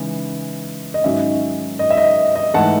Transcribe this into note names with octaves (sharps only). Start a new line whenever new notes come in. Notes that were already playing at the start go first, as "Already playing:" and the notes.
Already playing: C#3 E3 G#3 D#4
D#5
G#2 D#3 F#3 C#4 E5
D#5
E5
D#5
D#5
G#2 E3 A3 F#5 A5